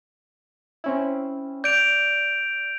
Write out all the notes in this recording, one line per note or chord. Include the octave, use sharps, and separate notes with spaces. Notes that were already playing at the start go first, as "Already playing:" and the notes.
C4 C#4 E4
D5 G6 D7 F7